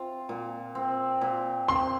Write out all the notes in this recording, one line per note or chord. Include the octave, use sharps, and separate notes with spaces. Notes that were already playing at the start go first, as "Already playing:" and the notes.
Already playing: C4 F4
A#2
C4
A#2
C4 C6